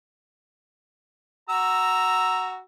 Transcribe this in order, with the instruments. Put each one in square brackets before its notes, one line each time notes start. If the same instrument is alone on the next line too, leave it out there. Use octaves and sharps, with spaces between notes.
[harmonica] F#4 A#5 E6